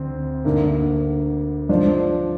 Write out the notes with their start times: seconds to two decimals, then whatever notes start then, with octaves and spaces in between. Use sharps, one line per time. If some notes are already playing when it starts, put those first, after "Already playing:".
Already playing: D2 C4
0.45 D2 D3 A#3
1.69 F3 D4 F4 C5